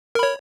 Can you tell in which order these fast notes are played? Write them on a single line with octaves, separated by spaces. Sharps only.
A#4 B5 C#5